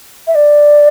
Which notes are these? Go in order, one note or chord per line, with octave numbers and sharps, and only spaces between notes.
E5
D5